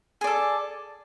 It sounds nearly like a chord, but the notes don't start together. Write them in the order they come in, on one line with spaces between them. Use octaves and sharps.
G#4 D5 A4